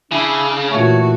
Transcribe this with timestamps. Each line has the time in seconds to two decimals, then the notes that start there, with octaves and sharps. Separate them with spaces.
0.11 C#3 D4 E4
0.70 A#2 E3 A3 F#4 C#5